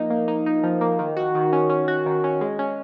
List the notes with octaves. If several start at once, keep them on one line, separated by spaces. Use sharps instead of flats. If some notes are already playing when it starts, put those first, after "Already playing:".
Already playing: F3 A#3 D#4
A#3
D#4
D#4
F3
A#3
D#3
F#4
D#3
C#4
C#4
F#4
D#3
C#4
G#3
C#4